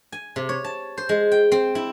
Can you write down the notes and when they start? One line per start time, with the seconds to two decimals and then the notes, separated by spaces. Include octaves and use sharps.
0.12 G#5
0.36 C3
0.49 C#5
0.64 A5
0.97 C5
1.09 G#3
1.32 G5
1.52 C4
1.75 E4